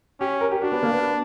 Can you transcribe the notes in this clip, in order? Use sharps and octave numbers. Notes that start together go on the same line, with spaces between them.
C#4 G4
A#4
G4
D4 F#4
B3
A#3
B3